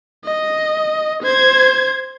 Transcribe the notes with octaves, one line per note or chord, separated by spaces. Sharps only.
D#5
C5 G#6